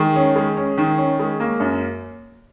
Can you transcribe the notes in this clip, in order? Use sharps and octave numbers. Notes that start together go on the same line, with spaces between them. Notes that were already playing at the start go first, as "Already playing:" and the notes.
Already playing: D#3 G#3
C#4
G#3
C#4
D#3
C#4
G#3
A#3
F#2